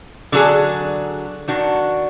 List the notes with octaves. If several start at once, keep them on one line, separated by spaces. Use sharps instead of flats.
D3 F#3 D4 G#4
D#3 F#3 D4 F#4